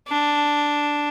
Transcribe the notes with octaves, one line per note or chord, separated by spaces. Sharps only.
D4